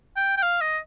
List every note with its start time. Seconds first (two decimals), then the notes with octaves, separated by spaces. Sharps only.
0.17 G5
0.37 G5
0.42 F5
0.61 D#5